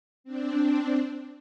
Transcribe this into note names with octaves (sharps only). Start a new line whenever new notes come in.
C4 D4